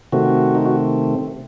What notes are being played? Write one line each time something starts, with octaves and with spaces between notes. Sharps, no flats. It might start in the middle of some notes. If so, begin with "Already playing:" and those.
C3 D#3 A3 C4 F#4
D#4
F#4